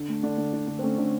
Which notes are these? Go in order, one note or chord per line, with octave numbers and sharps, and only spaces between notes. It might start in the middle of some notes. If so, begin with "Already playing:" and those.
Already playing: D3
A3
D3 D4
D3
D3
D3
C4
A3 C#4
D3